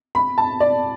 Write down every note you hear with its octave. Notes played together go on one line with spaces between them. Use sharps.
B5
A5
D5